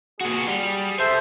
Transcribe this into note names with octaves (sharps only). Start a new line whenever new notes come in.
A#2 F#4 G#4
G3
A4 C5 E5